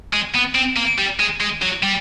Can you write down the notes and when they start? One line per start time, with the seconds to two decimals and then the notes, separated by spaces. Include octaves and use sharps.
0.13 G#3
0.35 B3
0.55 C4
0.77 A#3
0.99 G3
1.19 G#3
1.40 G#3
1.62 F#3
1.83 G3